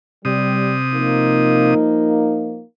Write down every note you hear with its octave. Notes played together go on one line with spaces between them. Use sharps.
C3 G3 D#6
F3 A#3 D#4